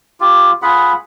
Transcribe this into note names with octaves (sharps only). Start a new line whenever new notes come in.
F4 G4
F4 G#4 F#5 B5